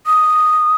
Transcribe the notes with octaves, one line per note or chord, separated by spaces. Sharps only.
D#6